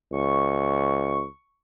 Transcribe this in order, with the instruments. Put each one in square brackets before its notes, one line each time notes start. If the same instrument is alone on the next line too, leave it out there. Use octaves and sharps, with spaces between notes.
[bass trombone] C#2 [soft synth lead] C#6